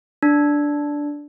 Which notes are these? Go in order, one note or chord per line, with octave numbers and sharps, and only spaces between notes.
D4